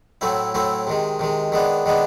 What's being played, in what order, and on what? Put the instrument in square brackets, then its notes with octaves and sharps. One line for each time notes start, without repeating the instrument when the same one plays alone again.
[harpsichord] A2 F#3 A3 C4 E4
A2 F#3 A3 C4 E4
C3 D#3 G#3
C3 D#3 G#3
D#3 G#3 B3 D4
D#3 G#3 B3 D4